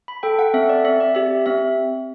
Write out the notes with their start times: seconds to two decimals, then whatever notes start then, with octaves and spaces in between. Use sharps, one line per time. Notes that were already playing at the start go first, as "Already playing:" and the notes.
0.08 B5
0.23 A4 G5
0.39 F#5
0.54 C4 E5
0.69 D5
0.84 C4 E5
1.00 D5
1.15 G4 E5
1.46 C4 E5